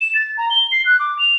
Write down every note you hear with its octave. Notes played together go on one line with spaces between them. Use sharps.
E7
A6
A#5
G7
C7
F#6
D6
F7